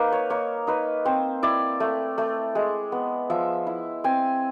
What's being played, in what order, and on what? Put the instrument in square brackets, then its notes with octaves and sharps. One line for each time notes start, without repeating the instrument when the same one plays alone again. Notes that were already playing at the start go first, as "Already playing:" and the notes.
Already playing: [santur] A#3 D#4 B4
C#5
A#3 C#5
D#4 B4
C4 C5
E4 D5
A3
A3
G#3
B3
F3 E5
E4
C4 G#5